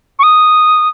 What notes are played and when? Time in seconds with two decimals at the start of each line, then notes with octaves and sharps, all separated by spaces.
0.19 C#6
0.23 D#6